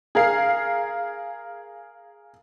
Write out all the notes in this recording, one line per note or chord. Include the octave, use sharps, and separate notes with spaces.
G#4 A#4 F5